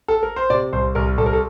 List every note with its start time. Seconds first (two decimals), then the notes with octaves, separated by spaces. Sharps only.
0.08 A4
0.23 A#4
0.36 C5
0.50 C3 D5
0.73 C2 C5
0.95 C2 A#4
1.18 C2 A4
1.26 A#4
1.33 A4